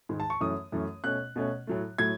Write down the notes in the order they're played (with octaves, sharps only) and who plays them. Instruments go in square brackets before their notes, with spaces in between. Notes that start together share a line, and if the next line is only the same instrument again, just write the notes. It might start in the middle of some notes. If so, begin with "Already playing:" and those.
[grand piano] G#2 D#3 G#3
A5
C#6
F#2 E3 A3 C#4 D#6
F#2 E3 A3 C#4
B2 A3 C#4 F#6
B2 A3 C#4
A2 F#3 A3
A2 F#3 A3 G#6